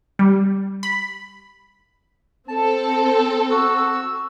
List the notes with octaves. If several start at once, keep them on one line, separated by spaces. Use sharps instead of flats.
G3
B5
C4 A4 A5
F#4 E6